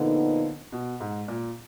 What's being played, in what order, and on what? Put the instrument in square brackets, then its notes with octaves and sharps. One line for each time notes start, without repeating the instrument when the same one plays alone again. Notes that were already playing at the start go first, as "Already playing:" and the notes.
Already playing: [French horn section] A#2 F3 B3 D#4 [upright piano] D3
[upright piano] B2
G#2
A#2